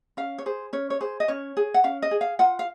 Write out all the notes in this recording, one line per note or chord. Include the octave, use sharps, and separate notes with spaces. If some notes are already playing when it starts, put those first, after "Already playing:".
C#4 F5
C#5
G#4 C5
C#4 C#5
C#5
G#4 C5
D#5
C#4 C#5
G#4
F#5
C#4 F5
D#5
G#4
F5
F4 F#5
F5